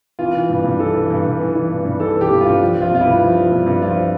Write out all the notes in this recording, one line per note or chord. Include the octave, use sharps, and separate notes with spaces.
E3 F4
E3
G2
G2
E3 A4
E3
G2
G2
E3
E3
G2
G2
E3 A4
E3 G4
G2
F4
G2
F3
F3
F4
G2 F4
E4
G2
F3
F3
G2
G2
F3 F4
F3